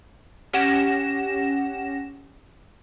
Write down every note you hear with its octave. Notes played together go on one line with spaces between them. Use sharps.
C#4 G4 F#5 A#6 E7